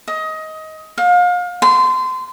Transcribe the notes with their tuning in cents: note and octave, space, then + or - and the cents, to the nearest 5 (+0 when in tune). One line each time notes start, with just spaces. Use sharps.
D#5 +20
F5 +35
C6 -25